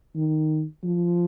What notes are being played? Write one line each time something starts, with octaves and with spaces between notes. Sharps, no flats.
D#3
F3